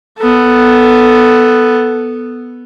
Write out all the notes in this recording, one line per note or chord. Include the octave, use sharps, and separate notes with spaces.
B3 A4